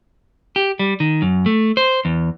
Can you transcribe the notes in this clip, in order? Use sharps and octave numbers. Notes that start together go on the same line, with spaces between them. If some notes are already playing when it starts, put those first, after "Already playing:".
G4
G3
D#3
F#2
A3
C5
E2